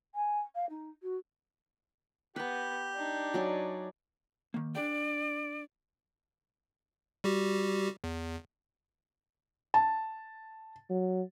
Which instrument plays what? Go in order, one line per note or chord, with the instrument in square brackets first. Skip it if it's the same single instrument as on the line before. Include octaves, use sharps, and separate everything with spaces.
[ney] G#5
F5
D#4
F#4
[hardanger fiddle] B3 [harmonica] G4 [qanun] B4 A#5
[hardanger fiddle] D4 D#4
[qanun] F#3 D5 G#5
[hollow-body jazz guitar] D#3 A#3
[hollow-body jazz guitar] D4 G#4 G5 [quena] D5
[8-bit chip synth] G3 F#4 G4
E2
[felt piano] A5
[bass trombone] F#3